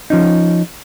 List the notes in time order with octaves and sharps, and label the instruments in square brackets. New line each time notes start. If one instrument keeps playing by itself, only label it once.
[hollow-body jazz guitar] F3 C#4 D#4